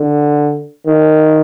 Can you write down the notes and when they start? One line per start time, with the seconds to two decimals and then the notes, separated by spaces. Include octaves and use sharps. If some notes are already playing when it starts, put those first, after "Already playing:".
Already playing: D3
0.87 D#3